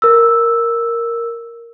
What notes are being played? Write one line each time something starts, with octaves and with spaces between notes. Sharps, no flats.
A#4 E6